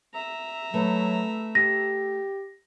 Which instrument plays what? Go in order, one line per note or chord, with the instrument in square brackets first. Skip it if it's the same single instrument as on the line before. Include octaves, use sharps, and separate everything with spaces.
[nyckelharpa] E5 A#5
[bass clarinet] F#3 [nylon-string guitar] A3 B4
[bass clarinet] G4 [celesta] A#6